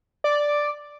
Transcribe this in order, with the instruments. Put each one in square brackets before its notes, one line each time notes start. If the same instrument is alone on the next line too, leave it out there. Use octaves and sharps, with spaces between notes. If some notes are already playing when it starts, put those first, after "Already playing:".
[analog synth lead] D5